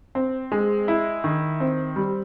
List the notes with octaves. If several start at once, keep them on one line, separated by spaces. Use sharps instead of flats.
C4
G#3
E4
D#3
C4
G3